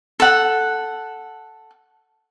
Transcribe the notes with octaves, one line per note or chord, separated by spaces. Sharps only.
A4 F#5